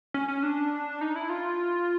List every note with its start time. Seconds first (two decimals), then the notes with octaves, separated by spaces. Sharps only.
0.14 C#4
0.28 C#4
0.43 D4
1.01 D#4
1.16 E4
1.29 F4